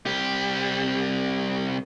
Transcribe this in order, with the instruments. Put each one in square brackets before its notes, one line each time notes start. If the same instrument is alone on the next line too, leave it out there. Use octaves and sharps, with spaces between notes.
[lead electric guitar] C2 G4